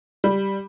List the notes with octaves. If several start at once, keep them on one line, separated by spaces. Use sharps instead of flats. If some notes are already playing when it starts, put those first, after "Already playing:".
G3